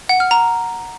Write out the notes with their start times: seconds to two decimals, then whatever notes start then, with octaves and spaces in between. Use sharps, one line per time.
0.09 F#5
0.20 F6
0.31 A#5